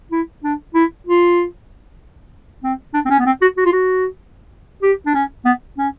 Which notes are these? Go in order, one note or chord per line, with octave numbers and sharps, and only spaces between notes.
E4
D4
E4
F4
C4
D4
C4
C#4
B3
C4
F#4
F#4
F4
F#4
G4
D4
C#4
B3
C#4